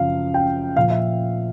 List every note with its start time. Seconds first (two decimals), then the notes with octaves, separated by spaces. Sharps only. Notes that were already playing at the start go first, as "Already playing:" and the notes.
Already playing: F#2 C#3 F3 F5
0.34 G5
0.77 A#2 F3 F5
0.90 E5